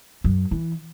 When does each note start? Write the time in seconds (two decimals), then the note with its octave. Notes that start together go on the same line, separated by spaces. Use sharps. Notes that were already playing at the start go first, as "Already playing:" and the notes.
0.24 F#2
0.51 E3